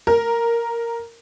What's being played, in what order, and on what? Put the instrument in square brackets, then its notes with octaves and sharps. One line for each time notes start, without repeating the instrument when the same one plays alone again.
[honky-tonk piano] A#4